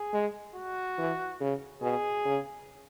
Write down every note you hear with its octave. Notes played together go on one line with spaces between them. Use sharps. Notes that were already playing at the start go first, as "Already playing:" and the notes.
Already playing: G#4
G#3
F#4
E3
C#3
B2 G#4
C#3